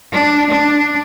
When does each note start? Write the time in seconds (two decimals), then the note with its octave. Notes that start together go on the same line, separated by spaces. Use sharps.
0.12 D4
0.50 D4